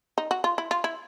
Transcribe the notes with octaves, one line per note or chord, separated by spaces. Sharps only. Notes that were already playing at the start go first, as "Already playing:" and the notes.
D#4
F#4
F4
E4
F4
E4